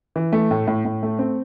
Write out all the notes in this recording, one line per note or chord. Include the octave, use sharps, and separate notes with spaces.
E3
A3
A2
A2
A2
A3
C4